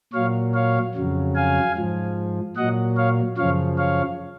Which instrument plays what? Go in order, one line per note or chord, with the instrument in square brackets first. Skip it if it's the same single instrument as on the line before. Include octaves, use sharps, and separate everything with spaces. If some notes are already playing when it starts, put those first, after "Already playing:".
[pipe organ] A#2 F#3 C#5 F5
C#5 F5
F2 C#3 F#3
F5 G#5
G#2 F3
A#2 F#3 D#5 F#5
C#5 F5
F#2 C#3 F3 C#5 F5
C#5 F5